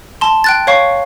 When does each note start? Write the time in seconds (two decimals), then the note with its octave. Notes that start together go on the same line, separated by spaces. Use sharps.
0.21 A5 C6
0.44 G5 F#6 A6
0.67 C#5 F5 C#6